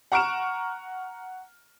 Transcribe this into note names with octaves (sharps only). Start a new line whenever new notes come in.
F#5 A#5 C#6 F6 D7 E7